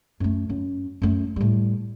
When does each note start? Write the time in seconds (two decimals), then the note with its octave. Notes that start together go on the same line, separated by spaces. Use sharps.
0.20 F#2 A3
0.49 F#2
1.02 F#2 A3
1.36 A2 G3